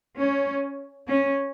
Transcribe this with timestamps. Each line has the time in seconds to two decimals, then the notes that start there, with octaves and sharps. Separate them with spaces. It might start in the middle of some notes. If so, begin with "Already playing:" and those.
0.20 C#4
1.09 C#4